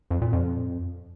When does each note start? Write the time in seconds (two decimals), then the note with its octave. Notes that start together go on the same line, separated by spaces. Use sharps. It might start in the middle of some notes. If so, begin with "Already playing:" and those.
0.11 F2
0.22 A#2
0.33 F2